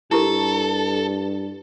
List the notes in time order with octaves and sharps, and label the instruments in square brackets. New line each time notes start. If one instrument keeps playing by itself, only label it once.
[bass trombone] G2 [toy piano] E4 G4 A#4 [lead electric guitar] A4